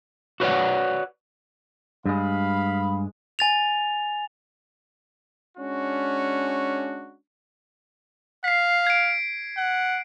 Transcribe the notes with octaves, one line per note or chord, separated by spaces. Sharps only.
F#4 B4 C#5 D5 F#5
G2 G#3 F5 B5
G#5 A6 F7
G#3 C#4 D4 F#4
F5 B6 C7
G#6 D7
F#5